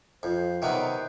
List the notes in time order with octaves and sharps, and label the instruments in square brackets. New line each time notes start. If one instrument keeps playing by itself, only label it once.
[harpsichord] F2 [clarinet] C5
[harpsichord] C3 D#3 F#3 B3